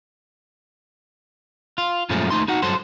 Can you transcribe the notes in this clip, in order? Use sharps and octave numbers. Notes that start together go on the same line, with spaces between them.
F4
F#2 A#2 F3 G#3 A3 C#4
D#2 A3 D#4 C6
D#4 F#4 F#5
G2 F#3 A4 C5 C6